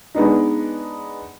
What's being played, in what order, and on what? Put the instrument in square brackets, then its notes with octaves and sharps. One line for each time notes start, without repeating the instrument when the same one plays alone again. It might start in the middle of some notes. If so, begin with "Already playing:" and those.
[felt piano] G#3 B3 D4 D#4